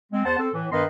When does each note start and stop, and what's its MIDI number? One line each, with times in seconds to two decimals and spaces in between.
0.12 0.23 56
0.12 0.23 60
0.25 0.36 40
0.25 0.36 72
0.25 0.36 78
0.25 0.36 81
0.39 0.49 60
0.39 0.49 69
0.54 0.66 45
0.54 0.66 52
0.71 0.83 43
0.71 0.83 51
0.71 0.83 59
0.71 0.83 71
0.71 0.83 75
0.71 0.83 84